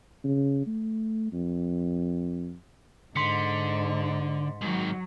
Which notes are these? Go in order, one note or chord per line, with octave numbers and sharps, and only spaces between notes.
C#3
A3
F2
G#2 D3 C6 B6 C#7
G#2 D#3 F#3